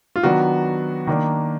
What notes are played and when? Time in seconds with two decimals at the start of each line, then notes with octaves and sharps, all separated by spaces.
0.16 F4
0.23 D#3 F#3 B3 D4 F#4
1.07 D#3 A#3 D4